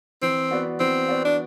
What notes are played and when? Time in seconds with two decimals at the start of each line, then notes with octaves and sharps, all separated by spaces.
0.22 E3 C4
0.51 B3 F#4 B4 D5
0.80 E3 C4
1.08 B3 F#4 B4 D5
1.25 D4